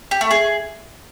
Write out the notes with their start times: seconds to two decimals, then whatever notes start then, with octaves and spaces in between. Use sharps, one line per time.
0.11 G4
0.21 A3
0.31 G#4